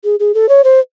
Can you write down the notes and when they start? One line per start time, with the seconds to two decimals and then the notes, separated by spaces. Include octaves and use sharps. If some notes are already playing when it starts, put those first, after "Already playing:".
0.04 G#4
0.20 G#4
0.34 A4
0.49 C#5
0.64 C5